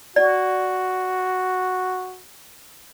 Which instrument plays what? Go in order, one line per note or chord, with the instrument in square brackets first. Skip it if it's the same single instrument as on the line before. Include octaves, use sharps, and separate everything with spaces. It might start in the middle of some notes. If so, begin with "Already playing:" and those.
[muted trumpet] F#4 [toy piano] D5